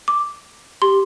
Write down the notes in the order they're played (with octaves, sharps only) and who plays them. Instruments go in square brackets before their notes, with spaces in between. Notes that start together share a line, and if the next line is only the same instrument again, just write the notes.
[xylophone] D6
[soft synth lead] G4 [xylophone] C6